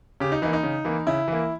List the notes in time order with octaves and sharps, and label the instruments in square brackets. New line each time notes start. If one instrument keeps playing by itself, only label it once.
[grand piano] C#3 G4
D#4
E3 D#4
A#3
D#4
C#3
E3 A#3
C#3 E4
E3 A#3